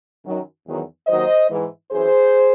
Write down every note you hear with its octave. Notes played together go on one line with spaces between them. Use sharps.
F#2 D#3 F#3
E2 D#3 F#3
D#2 D#3 F#3 C5 D#5
G#2 E3
F#2 E3 G#4 C5